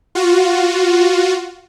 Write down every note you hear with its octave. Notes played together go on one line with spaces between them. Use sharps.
F4 F#4